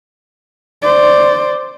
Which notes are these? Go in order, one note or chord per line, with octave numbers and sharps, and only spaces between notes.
C5 D5